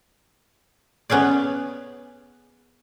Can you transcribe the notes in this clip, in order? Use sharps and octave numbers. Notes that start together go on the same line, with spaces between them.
B3 C#4 G#4 D5